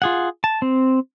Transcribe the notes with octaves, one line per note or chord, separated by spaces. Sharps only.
F4 G#4 F#5
A5
C4